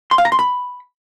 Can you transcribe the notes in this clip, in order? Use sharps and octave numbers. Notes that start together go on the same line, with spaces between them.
C6
F5
A#5
C6
B5